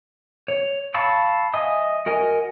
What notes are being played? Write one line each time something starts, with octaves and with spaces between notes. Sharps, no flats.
C#5
F5 A5 B5 C#6 E6
D#5 E5 G#5 D#6
F#4 A#4 D#5 G#5